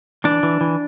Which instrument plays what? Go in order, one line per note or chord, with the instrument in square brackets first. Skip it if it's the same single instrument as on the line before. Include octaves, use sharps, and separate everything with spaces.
[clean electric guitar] E3 D4
E3
E3